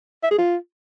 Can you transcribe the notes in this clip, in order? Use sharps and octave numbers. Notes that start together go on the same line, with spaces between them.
E5
G#4
F4